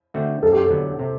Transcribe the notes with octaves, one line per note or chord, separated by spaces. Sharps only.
D3 A3 C4 F#4
F#2 A4
G4
A4
D3 F#3 B3
C3